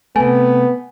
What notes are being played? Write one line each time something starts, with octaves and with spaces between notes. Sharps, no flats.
C3 A3 B3 G#5